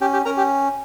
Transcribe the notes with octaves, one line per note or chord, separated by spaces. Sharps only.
C#4 G4 G5
G4 G5
C#4 A#4 A#5
G4 G5